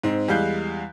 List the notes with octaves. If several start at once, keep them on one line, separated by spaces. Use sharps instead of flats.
G#2 C4
E2 G3 G#3 F5 F#6 G6